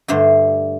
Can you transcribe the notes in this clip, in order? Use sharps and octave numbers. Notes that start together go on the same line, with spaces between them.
G2 D3 A3 C5